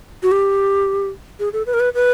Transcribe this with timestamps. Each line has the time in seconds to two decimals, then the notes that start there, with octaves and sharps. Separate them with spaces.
0.23 F#4
0.31 G4
1.40 G#4
1.53 A4
1.67 B4
1.74 A#4
1.80 B4
1.95 B4